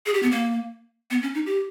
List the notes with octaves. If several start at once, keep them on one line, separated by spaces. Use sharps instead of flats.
G#4
G4
B3
A#3
B3
C#4
D#4
G4